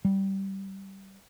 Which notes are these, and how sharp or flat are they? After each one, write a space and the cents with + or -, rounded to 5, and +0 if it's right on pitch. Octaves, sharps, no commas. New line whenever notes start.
G3 -15